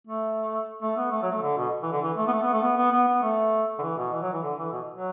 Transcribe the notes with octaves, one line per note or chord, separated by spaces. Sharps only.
A3
A3
B3
A3
F#3
A3
D3
B2
E3
D3
E3
A3
B3
A3
B3
A3
B3
B3
B3
B3
A3
D3
E3
B2
E3
F#3
E3
D3
E3
B2
F#3